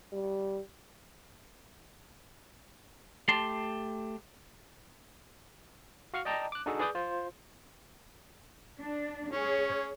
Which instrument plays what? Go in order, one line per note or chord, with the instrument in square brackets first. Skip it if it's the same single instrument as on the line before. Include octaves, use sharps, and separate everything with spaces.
[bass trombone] G3
[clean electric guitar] A3 G4 A5 C6
[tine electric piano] F#4 F5 C#6 F6
D5 D#5 G5 A5 A#5 D6
D6 F#6
D4 D#4 F#4 G#4 A4
G#4 B4 D5 D6 D#6 G6
F4 C5
[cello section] D4
[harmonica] C#4 [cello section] G#4 C#5